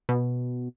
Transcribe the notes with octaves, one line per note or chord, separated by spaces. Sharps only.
B2